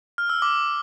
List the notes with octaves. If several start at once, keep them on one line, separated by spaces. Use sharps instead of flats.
F6
E6
D6